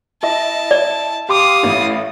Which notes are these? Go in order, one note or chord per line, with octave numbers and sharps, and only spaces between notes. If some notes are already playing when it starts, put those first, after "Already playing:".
E4 D#5 A5
D5
G4 F5 C6 D6 D#6
A1 A2